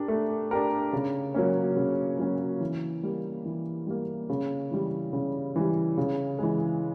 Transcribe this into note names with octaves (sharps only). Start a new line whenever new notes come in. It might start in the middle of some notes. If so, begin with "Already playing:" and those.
Already playing: D4 G4 A#4
A3
D4 G4 A#4
C#3
F#3 A#3 C#4
C#3
F#3 A#3 C#4
E3
G3 A#3
E3
G3 A#3
C#3
E3 G3
C#3
E3 G3
C#3
E3 G#3